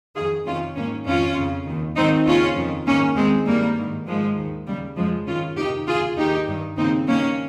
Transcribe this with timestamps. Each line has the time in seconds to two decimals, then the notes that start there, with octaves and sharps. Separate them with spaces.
0.16 F2 D#3 F4 G#4
0.46 F2 C3 D#3 C#4 F4
0.76 G#2 D#3 A#3 C#4
1.06 F2 D#3 C#4 F4
1.36 F2 C#3
1.66 D#2 D#3
1.96 G#2 D#3 C4 D#4
2.26 D#2 C#3 C#4 F4
2.56 F2 D#3
2.86 G#2 D#3 A#3 C#4
3.16 D#2 D#3 G#3 C4
3.46 G2 D#3 G3 A#3
3.77 G#2 D#3
4.06 G#2 D#3 F3 G#3
4.36 D#2 D#3
4.67 D#2 C#3 G3
4.97 F2 C#3 F3 G#3
5.27 G2 D#3 C#4 F4
5.57 F2 C3 D#3 D#4 G4
5.86 D#2 C#3 F4 G#4
6.17 D#2 D#3 D#4 G4
6.47 G2 D#3
6.77 D#2 C#3 C4 D#4
7.07 G2 D#3 A#3 C#4